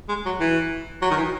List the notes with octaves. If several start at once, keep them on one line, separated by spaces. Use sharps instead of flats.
G#3
F#3
E3
F#3
D#3
E3